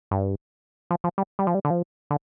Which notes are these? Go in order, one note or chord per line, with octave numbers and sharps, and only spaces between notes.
G2
F3
F3
G3
G3
F3
G3
D3
F3
D3